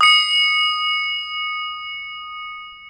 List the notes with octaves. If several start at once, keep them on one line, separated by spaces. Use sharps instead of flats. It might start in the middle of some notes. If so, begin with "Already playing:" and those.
D#6 C#7